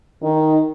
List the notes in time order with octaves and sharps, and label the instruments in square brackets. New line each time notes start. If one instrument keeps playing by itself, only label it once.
[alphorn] D#3 [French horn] D#4